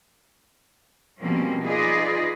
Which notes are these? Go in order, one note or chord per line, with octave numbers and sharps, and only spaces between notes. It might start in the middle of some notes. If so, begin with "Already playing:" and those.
B2 F3 G3 A#3 C4 C#4
D#4 F4 G#4 B4 D5 D#5